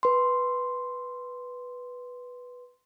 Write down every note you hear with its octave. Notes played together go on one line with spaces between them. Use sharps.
B4 C6